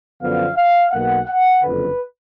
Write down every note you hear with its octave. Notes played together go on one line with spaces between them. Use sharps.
F#2 D3 F3 B3 F5
F5
B1 B2 A#3 F#5
F#5
F#1 F2 D3 B4